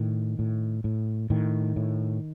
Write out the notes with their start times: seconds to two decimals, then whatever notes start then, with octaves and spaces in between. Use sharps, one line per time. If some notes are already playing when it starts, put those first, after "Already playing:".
Already playing: A2 D#3
0.39 A2
0.84 A2
1.30 A2 D#3
1.76 A2